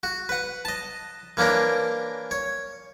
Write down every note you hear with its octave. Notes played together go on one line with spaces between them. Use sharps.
F#4
B4 F#5
D#5 A5
E3 A#3 C#4 D4 A#4
C#5